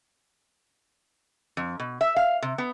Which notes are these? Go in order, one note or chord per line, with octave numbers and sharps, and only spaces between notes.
F2
B2
E5
F5
C3
B3